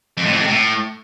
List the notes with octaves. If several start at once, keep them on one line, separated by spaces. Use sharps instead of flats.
F2
A2
F2
C3
A2